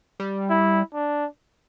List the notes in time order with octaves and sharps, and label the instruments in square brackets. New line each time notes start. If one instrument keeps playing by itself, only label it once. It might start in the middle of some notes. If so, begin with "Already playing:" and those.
[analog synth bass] G3
[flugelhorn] E4
D4